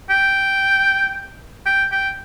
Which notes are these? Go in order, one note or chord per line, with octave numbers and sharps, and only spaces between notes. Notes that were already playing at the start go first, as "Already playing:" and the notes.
G5
G5
G5